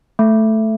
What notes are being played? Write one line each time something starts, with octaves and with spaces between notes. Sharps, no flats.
A3